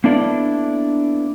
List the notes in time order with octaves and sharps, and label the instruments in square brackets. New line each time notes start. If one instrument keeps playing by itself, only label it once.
[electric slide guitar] A#3 B3 D4 E4 A4 D5